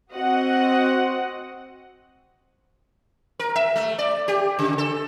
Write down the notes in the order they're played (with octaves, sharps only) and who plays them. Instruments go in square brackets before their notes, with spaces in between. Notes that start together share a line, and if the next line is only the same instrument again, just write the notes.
[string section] C4 F#4 D#5 F#5
[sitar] A#4
E5
A3
D5
G4
C#3
A4